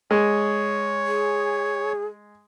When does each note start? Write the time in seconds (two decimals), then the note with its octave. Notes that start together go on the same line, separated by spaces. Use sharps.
0.11 G#3 C#5
1.07 G#4